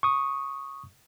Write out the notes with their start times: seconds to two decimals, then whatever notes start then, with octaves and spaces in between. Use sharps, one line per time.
0.03 C#6 D#6